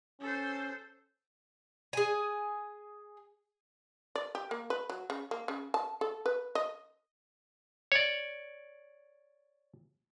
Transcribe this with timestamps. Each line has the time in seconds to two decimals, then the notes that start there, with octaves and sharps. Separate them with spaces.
0.21 C#4 A4 C5
1.93 G#4 G#5
4.15 D5
4.35 G4
4.51 A#3
4.70 B4
4.90 F#3
5.10 C#3
5.31 A#3
5.48 C#3
5.74 A5
6.01 A4
6.26 B4
6.55 D#5
7.92 C#5 D5